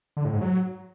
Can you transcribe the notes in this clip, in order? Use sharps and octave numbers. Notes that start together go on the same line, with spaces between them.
D3
A2
G#2
F#3